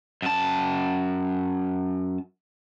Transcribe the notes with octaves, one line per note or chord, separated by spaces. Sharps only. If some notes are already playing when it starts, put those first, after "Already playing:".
F#2 A5